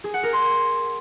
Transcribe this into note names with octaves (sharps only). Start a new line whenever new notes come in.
G#4
F#5
A#4
C6